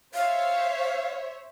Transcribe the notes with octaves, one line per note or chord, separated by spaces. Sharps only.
C5 C#5 E5 F5